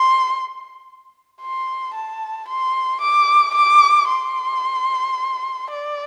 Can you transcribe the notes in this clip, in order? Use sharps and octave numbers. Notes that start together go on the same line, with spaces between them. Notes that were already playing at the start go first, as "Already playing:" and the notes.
Already playing: C6
C6
A5
C6
D6
D6
C6
D5